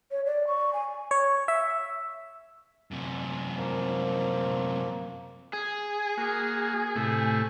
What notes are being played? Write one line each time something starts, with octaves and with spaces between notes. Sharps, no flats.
C#5
D5
C#6
G#5
C#5
E5
F#2 C3
F3 A#3
G#4
A#3 F#4
A2 C3 A3